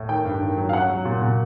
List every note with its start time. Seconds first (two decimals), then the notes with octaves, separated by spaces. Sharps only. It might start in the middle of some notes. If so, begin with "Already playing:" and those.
Already playing: A2
0.09 D#3 G5
0.25 G2
0.42 D#3
0.57 F#3
0.69 F5
0.73 C#4 F#5
0.90 F#3
1.05 A#2
1.22 A#2